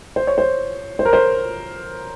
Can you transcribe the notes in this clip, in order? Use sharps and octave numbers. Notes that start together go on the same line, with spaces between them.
C5
C#5
C5
C5
A#4
C5